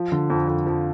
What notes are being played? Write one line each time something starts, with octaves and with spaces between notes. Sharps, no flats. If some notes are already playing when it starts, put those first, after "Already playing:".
Already playing: F3
D3
F2
F2
F3